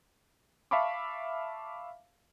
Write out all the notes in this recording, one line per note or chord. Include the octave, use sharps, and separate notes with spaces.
E5 F5 A5 B5 C#6 D6